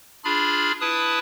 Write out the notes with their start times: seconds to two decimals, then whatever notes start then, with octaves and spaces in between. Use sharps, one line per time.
0.24 D4 F4 G#4 B5 F6
0.81 E4 B4 A5 D#6